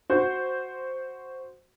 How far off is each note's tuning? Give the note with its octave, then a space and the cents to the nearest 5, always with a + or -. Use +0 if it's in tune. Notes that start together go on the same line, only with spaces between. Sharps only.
F#4 +0 C5 +0